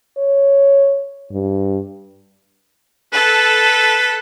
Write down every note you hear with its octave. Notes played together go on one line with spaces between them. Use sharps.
C#5
G2
A4 B4